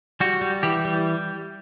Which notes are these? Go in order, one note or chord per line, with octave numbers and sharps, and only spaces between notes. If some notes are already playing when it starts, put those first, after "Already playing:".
G3 F#4
G3
E3 G4
G3